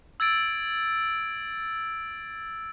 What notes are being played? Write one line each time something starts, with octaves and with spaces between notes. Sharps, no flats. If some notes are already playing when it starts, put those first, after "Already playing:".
E6 G#6 A6 D7